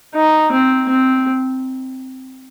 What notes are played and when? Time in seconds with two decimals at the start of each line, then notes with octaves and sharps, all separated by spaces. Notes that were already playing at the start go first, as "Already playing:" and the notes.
0.15 D#4
0.52 C4
0.89 C4